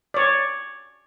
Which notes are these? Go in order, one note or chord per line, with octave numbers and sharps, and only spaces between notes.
C#5 D5